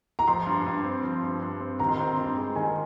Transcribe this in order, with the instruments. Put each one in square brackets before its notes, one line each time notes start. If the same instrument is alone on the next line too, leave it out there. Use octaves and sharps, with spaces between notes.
[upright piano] A#5
[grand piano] F3 [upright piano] C6
[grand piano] G2
G2
C4
F3
G2
G2
C4
[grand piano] D#3 [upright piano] A#5
[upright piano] C6
[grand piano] C4 [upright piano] A#5
[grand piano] G2
G#3
[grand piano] D#3 [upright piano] G#5